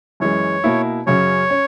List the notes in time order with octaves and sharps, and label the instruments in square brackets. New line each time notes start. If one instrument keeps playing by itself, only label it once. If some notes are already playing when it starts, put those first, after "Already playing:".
[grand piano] F#2 E3 G#3 [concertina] C#5
[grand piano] B2 A#3 E4
[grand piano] F#2 C#3 F#3 [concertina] C#5
[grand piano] C#4